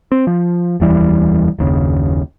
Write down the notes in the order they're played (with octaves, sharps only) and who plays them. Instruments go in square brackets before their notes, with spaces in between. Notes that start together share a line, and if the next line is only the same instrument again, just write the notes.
[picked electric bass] C4
F3
F1 D#2 E3 G3
F#1 D#2 C#3